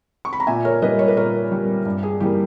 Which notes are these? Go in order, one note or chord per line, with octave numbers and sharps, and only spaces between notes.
C#6
B5
A#5
A#2 E5 G#5
A#4 C#5
G3 A#3 B4 D#5
C#5
B4
A#2 A#4 C#5
G3 A#3
G2
G#4
E3 G3 A#3 G4